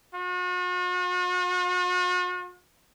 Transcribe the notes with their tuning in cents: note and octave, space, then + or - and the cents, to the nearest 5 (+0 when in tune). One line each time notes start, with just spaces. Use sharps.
F#4 -45